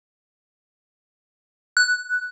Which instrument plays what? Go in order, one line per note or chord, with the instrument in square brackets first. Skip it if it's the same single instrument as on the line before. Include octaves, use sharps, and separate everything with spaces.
[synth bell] F#6